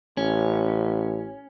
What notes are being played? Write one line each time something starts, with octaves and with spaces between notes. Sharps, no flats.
A1 C#4